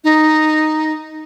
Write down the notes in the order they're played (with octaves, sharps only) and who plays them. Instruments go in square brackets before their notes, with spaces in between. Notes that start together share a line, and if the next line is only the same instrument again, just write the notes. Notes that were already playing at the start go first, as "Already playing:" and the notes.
[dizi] D#4